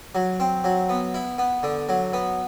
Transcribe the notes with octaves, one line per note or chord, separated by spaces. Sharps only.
F#3
C4
F#3
B3
E4
B3
D3
F#3
B3